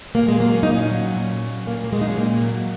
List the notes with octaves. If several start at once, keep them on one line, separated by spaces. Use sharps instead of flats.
A#2 A#3
G#3
F#3 A#3
C#4
A#2 D#4
C#4
F#3
A#2
F#3
A#2 A#3
A#3
F#3 G#3
D#4
C#4
A#2 A#3
F#3